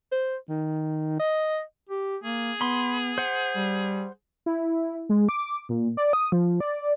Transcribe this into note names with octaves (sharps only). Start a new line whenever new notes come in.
C5
D#3
D#5
G4
A#3 G#4
B3 B5 C6
C5 F#5
G3
E4
G#3
D6
A#2
D5
D#6
F3
D5